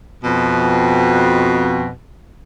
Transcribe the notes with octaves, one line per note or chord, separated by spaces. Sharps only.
F2 B2